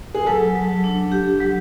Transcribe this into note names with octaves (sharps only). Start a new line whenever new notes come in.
G#4
F#3 A4
F#3
D4
G4
F#3